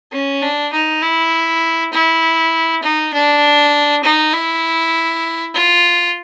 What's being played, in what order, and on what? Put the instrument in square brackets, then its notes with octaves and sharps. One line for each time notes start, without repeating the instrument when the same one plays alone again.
[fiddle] C#4
D4
D#4
E4
E4
D#4
D4
D#4
E4
F4